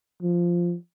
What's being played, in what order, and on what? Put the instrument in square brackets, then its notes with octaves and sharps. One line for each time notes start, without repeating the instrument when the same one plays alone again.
[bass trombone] F3